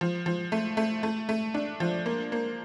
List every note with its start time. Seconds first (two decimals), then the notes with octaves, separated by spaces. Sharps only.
0.01 F3
0.26 F3
0.52 A3
0.77 A3
1.03 A3
1.29 A3
1.54 D4
1.80 F3
2.06 A#3
2.32 A#3